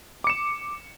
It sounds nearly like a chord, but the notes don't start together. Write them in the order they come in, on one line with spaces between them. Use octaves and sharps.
D6 C#7 E7